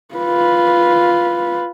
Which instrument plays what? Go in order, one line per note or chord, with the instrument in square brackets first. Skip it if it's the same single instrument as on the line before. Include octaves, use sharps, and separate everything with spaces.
[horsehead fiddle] F4 B4